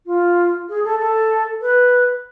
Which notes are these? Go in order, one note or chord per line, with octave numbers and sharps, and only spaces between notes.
F4
G#4
A4
A4
B4